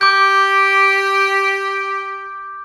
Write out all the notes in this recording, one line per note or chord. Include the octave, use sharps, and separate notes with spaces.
G4 D6 G6